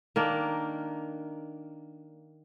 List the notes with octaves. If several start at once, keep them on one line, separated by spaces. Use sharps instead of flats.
D#3 A#3 D4